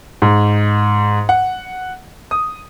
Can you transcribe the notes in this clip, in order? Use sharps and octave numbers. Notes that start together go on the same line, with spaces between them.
G#2
F#5
D#6